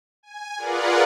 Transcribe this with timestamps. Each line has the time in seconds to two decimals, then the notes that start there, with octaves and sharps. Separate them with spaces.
0.23 G#5
0.58 F4 G#4 A#4 B4 D5 F#5